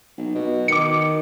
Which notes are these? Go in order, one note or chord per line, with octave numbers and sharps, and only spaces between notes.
B1
B2
D#3 D6 C#7